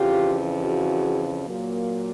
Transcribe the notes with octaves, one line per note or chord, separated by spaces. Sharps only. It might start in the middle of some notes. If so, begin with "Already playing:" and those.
Already playing: F2 C#3 E3 F4 G4
F#4 G#4
A#2 F#3 A#3